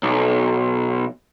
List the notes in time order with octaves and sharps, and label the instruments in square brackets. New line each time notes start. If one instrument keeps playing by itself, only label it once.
[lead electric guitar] B1